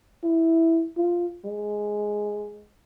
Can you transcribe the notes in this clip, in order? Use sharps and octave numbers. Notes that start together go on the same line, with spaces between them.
E4
F4
G#3